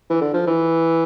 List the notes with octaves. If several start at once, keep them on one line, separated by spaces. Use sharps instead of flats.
E3
D3
F3
E3